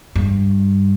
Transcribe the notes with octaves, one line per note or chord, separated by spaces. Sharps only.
G2